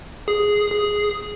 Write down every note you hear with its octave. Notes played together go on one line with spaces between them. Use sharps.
G#4
G#4